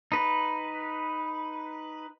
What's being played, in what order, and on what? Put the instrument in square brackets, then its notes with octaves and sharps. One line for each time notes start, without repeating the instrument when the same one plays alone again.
[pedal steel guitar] D#4 B4